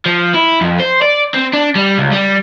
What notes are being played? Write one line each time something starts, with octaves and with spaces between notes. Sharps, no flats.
F3
E4
F2
C5
D5
C4
D4
G3
C#2
G3